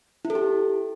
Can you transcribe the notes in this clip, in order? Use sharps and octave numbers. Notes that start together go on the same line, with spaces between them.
E4
A4
G4